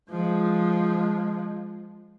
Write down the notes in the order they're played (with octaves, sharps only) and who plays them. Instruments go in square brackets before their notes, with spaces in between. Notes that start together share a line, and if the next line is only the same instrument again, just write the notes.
[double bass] F3 G#3